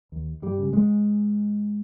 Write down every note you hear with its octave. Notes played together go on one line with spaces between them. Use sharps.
D#2
G2 G3
C#3
G#2 G#3